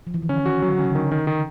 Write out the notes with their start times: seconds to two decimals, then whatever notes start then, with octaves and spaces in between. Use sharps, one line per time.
0.07 F3
0.14 E3
0.22 D#3
0.29 D3 C#4
0.46 D#3 F#4
0.62 D#3 F#3
0.73 D3
0.78 C#4
0.84 C#3
0.95 D3 D#3
1.11 D#3
1.27 D#3